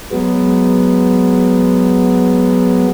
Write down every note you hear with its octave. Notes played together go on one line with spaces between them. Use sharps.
F#3 G#3 B3